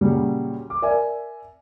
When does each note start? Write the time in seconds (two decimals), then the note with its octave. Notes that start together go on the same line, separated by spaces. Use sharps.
0.01 A#2 C#3 F#3 G3
0.70 D6
0.82 A#4 D5 E5 G#5